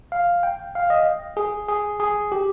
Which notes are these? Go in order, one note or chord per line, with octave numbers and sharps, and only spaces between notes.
F5
G5
F5
D#5
G#4
G#4
G#4
G4